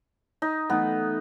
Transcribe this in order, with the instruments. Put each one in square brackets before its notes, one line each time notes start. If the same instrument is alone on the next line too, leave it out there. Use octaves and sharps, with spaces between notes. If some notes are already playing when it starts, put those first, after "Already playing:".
[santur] D#4
[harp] E3 A3 D#4 [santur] B3